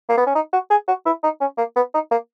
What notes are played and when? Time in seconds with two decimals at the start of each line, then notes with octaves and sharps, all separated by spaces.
0.09 A#3
0.17 B3
0.26 C#4
0.35 D#4
0.53 F#4
0.70 G#4
0.88 F#4
1.06 E4
1.23 D#4
1.40 C#4
1.58 A#3
1.76 B3
1.94 D#4
2.11 A#3